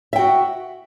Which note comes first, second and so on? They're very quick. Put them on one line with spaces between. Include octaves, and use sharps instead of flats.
E5 G5 F#4